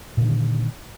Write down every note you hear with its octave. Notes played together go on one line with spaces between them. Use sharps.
A#2 D3 D#3